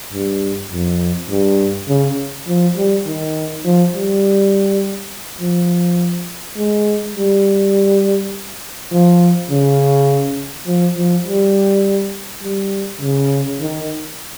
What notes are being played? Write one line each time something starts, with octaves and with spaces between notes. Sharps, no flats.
G2
F2
G2
C#3
F3
G3
D#3
F3
G3
F3
G#3
G3
F3
C#3
F3
F3
G3
G3
C#3
D#3